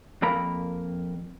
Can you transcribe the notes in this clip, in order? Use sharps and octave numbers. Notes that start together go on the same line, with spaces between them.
F2 A#3 A#4 A#5 B5